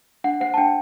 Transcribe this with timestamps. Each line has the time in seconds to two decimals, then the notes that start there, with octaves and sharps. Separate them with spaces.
0.24 D4 F#5
0.40 C5 F#5
0.54 A5
0.58 D4 G5